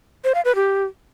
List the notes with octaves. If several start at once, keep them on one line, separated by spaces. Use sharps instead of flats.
C5
F5
B4
G4